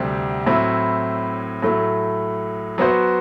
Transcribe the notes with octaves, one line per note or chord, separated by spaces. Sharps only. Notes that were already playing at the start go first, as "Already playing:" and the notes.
Already playing: D2 C3 G3 C4
A2 F#3 C4 E4
A2 F#3 A3
F#3 B3 F#4 C5